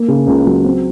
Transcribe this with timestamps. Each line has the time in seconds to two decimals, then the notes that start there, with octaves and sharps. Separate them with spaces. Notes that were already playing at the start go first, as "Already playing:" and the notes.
Already playing: A#3
0.08 C#3
0.27 C#2
0.47 F#3
0.65 C4